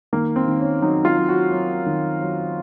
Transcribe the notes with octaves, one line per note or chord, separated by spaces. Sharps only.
D#3 A#3
C4
D#3
C#4
F#3 D#4
F4
F#3
F#4
F#3
D#3
F#3